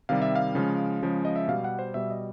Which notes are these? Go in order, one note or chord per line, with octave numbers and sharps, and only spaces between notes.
C3 D#3 G3 F5
E5
F5
C#3 F3 G#3
C#3 F3 G#3
D#5
E5
B2 G3 F5
F#5
C5
B2 G3 E5
D#5